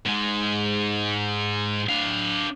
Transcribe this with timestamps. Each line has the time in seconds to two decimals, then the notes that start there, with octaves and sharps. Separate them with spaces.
0.06 G#2 G#3
1.89 D4 F5